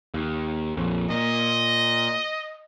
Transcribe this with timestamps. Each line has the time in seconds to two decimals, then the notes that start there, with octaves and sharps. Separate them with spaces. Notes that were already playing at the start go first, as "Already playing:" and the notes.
0.14 D#2
0.77 A#1 F2
1.10 A#2 D#5